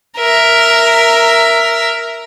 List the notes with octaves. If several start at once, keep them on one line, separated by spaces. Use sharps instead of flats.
A#4 E5